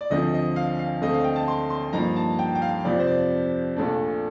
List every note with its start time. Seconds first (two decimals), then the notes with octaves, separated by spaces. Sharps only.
0.01 D5
0.10 D2 D3 F3 C4 D#5
0.34 D#5
0.56 F5
0.79 F5
1.02 D2 D3 A3 C4 D#5
1.14 F5
1.24 G5
1.36 A5
1.48 C6
1.70 C6
1.93 G2 F3 A#3 D#4 A#5
2.16 A5
2.39 G5
2.55 G5
2.62 F5
2.84 F2 C3 F3 D5
3.00 C5
3.07 D5
3.76 A#1 A#2 A3 D4